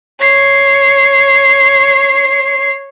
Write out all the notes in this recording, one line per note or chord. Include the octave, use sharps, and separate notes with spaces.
C#5 C7